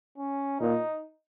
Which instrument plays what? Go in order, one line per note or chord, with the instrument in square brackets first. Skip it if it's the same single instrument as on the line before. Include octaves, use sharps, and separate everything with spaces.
[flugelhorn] C#4
[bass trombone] A#2 [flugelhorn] D#4